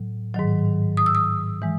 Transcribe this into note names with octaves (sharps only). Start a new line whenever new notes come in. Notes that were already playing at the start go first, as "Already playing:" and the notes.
Already playing: A2 F#3
G#2 D#3 F#3
D#6
E6
D#6
E3 G#3